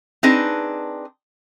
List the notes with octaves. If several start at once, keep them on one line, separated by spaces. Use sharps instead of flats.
C4 D4 D#4 G#4 B4